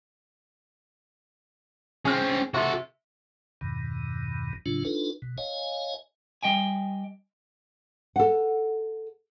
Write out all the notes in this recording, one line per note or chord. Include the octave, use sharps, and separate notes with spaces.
C4 C#4 G#4 F6
C3 F#4 A4
E2 G2 B2 D#3
A2 C#3 F#3 D4 F4
D4 D#4 F4 A4 B4
B2
C#5 D#5 F5 G#5
G3 D#5 G5 G#5
A4 F#5